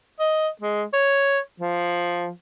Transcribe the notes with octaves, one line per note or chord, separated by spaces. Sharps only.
D#5
G#3
C#5
F3